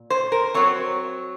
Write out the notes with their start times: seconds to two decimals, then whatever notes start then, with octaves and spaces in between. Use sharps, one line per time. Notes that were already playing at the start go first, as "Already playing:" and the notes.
Already playing: A#2
0.10 C5
0.32 A#4
0.54 F#3 C4 C#5